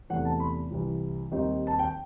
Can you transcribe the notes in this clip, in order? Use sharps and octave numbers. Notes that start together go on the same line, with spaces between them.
E2 C3 E3 A3 F#5
A5
B5
C2 C3 E3
D#2 D#3 G3 C4 D#4
A5
G5